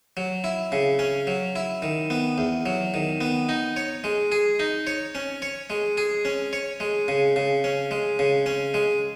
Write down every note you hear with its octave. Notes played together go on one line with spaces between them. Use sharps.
F#3
E4
C#3
C#4
F#3
E4
D#3
B3
E2
F#3
D#3
B3
D#4
C#5
G#3
G#4
D#4
C#5
C#4
C#5
G#3
G#4
C#4
C#5
G#3
C#3
C#3
C#4
G#3
C#3
C#4
G#3